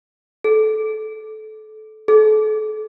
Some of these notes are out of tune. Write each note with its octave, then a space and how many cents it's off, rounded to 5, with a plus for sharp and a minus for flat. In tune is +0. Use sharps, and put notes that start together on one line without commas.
A4 -20
A4 -35